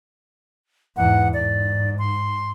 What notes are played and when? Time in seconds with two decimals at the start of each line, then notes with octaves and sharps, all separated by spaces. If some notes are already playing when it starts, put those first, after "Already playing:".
0.97 E2 G#2 F#5
1.34 G#2 D5
1.99 C6